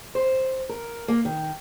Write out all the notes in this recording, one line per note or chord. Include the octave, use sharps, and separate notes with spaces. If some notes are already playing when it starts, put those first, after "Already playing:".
C5
A#4
A#3
D#3